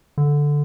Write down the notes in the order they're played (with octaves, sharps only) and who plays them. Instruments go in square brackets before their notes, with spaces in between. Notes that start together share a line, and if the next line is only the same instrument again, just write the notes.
[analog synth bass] D3